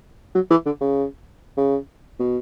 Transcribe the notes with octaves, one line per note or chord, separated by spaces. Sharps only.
F#3
E3
D3
C#3
C#3
B2